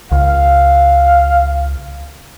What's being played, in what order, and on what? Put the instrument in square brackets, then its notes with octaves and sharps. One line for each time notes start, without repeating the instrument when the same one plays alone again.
[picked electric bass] C#2 [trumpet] F5